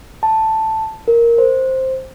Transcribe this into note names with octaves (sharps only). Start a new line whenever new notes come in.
A5
A#4
C5